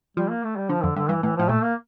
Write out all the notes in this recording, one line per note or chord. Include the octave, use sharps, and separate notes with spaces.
F3 G3
A#3
A3
G3
D3 F3
F2 D3
G2 D3
G2 E3
A2 E3
A2 F3
A#2 A3
A#3